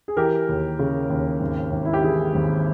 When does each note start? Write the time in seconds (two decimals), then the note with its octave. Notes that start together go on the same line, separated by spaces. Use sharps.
0.08 G#4
0.17 E3 G4 A#4
0.49 D#2
0.79 C#3
1.10 D#2
1.41 G#1
1.72 G#1
1.85 E4
1.93 G4
2.03 E3 E4 G#4
2.35 G#1